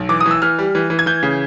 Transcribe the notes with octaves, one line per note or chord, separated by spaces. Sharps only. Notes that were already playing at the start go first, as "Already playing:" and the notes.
Already playing: B1
E3 D6
D#6
E3
E6
E3 F6
G3
E3
E3
G#6
E3 G6
C#3